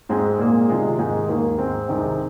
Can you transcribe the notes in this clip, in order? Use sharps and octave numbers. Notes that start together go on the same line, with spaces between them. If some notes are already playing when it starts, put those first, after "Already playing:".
G#2 G#3 C4 G#4
A#2 A#3 G#4
C3 D#3 G#3 F4 G#4
G#2 D#3 G#3 D#4 G#4
D#2 D#3 A#3
G#2 G#3 C4
C2 C3 D#3 G#3 C4